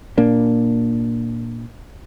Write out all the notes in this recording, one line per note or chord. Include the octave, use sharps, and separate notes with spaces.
A#2 A#3 D4